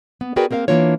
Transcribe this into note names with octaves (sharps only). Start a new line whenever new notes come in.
B3
F#4 G#4 A#4 B4 D5 G5
A#3 C4 A#4 E5 F5
E3 F3 A#3 D4 F4 C#5